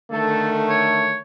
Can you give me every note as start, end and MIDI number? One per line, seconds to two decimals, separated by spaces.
0.12 1.19 50
0.12 1.19 51
0.12 1.19 57
0.12 0.48 69
0.69 1.17 73